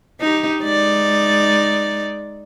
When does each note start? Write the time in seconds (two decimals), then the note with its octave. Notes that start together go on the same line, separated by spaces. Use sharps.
0.21 D#4 G4
0.62 G#3 D#4 D5